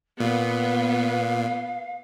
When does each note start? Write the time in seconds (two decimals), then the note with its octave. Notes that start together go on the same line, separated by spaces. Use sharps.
0.20 A#2 B3 F5